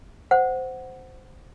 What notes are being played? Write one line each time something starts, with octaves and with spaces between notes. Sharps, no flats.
C5 F#5